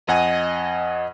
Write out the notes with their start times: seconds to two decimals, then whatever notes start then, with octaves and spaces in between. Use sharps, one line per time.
0.08 F2 D#5 F#5 G#5